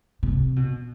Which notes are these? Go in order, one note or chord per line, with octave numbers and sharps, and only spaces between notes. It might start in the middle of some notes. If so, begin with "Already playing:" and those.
C3
B2